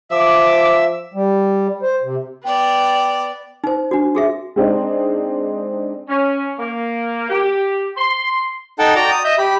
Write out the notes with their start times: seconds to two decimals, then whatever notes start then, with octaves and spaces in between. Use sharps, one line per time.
0.11 F3 E5 D6
1.14 G3
1.83 C5
2.03 C3
2.44 B3 D5 G5
3.64 D#4 C5
3.91 D4 F#4
4.15 F#4 G#4 E5
4.56 G#3 C4 D4 D#4
6.09 C#4
6.60 A#3
7.30 G4
7.98 C6
8.79 D#4 A4 F#5 G5 A5
8.96 F#4 D5 G5 A#5
9.11 D#6
9.25 D#5 E5 G6
9.38 G4 B5